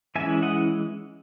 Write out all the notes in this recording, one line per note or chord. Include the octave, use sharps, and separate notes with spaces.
E3 G#3 C#4 E4 E5 G#5
D#5 F#5